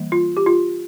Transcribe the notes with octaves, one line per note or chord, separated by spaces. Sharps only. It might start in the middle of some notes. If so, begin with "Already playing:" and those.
Already playing: E3 G3 A#3
F4
G4
F4